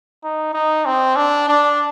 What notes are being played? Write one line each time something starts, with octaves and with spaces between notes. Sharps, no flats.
D#4
D#4
C4
D4
D4